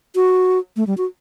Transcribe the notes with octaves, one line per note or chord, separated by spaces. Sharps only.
F#4
A3
G3
F#4